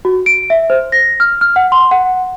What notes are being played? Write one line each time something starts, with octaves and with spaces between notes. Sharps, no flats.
F#4
D7
E5
C5
A#6
F6
F6
F#5
C6
F#5